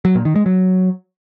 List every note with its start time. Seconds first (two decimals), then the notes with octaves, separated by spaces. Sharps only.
0.05 F#3
0.15 A#2
0.25 D#3
0.36 G#3
0.46 F#3